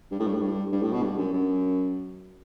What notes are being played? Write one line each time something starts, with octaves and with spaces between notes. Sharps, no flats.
G2
A2
G2
A2
G2
G2
A2
B2
G2
F#2
F#2